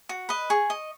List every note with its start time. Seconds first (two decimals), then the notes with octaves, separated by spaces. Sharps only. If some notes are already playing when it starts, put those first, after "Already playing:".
0.09 F#4
0.29 B4 D#5
0.50 G#4 C#6
0.70 D#5